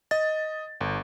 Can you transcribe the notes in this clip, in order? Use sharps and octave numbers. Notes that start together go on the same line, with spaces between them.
D#5 A6
G1